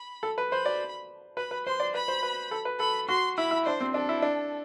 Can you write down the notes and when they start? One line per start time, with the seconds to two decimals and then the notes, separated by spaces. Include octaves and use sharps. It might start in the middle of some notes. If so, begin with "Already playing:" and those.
Already playing: B5
0.23 A4
0.38 B4
0.52 C5 B5
0.66 D5
1.37 B4 B5
1.51 B4
1.66 C5 C6
1.80 D5
1.94 B4 B5
2.08 C5
2.23 B4
2.51 A4
2.65 B4
2.80 A4 B5
3.09 F#4 C6
3.38 E4 B5
3.51 E4
3.65 D4 C5
3.80 C4
3.94 D4 A4
4.09 E4
4.22 D4